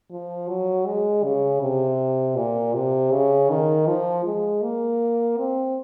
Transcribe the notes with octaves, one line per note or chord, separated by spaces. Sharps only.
F3
F#3
G#3
C#3
C3
A#2
C3
C#3
D#3
F3
G#3
A#3
C4